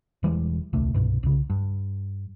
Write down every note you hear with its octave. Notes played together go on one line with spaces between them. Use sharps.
E1 E3 G3 G#3
D#1 C2 A3 D4
C2 G2 B2
C2 C#3
G2